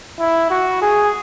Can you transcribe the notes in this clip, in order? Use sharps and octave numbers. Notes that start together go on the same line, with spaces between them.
E4
F#4
G#4